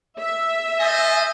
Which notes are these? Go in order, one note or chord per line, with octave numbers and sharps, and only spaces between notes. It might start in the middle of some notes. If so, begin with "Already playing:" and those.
E5
A4 C5 D#5 G#5